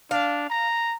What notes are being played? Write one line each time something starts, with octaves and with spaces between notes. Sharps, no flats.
D4 F5
A#5